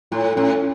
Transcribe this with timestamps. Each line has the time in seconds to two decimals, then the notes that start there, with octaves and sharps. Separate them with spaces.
0.12 A2 F4
0.37 A2 C#4